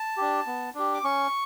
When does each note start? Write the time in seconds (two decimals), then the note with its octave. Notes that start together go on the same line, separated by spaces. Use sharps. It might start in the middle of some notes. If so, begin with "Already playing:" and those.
Already playing: A5
0.17 D4 G4
0.46 B3
0.75 D4 G4
0.94 D6
1.04 C#4 C#6